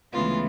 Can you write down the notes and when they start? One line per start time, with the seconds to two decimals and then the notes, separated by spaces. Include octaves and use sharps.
0.12 D2 C#3 E3 G#3 B3 F4